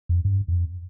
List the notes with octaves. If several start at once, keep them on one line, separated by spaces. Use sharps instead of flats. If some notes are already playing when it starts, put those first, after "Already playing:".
F2
G2
F2